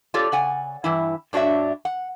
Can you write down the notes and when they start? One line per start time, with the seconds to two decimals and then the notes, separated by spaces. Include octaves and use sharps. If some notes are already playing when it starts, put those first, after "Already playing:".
0.14 F4 G4 A4 C#5 D5
0.32 C#3 F#5 G#5
0.84 G2 E3 E4
1.33 G2 D4 F#4 C#5 E5
1.85 F#5